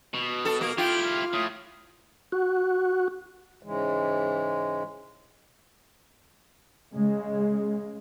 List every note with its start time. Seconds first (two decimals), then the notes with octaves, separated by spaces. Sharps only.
0.14 B2
0.45 A4
0.61 A#3
0.78 E4 F4 G4 G5
1.03 F6
1.33 A2 D#6
2.32 F#4
3.63 G#2 C#3 E3 G#3
6.93 C#3 G#3